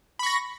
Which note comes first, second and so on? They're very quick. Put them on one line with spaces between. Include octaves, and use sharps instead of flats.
B5 C#6 A#6